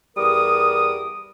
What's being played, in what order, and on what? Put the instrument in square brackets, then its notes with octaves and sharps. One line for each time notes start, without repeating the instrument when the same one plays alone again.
[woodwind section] E2 G3 A#4 D6 D#6